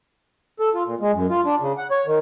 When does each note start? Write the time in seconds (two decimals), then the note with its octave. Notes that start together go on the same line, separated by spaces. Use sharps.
0.60 A4
0.74 F4
0.86 A#2
1.00 G#3
1.13 F#2
1.30 F4
1.45 D4
1.61 C#3
1.78 F#5
1.91 C#5
2.06 D#3